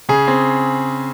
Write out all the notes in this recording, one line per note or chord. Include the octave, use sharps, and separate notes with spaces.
C#3 G#4
C4